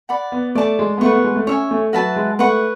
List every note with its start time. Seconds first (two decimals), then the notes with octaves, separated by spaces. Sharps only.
0.09 D5 F#5 B5
0.32 B3
0.55 A3 D5 A5 D6
0.79 G#3
0.98 B3
1.01 A3 B4 F#5 C#6
1.12 B3
1.24 G#3
1.36 A3
1.47 C#4 C#5 E5 G#5
1.71 A3
1.93 F#3 F#4 B4 E5 A5
2.16 G#3
2.39 A3 B4 F#5 C#6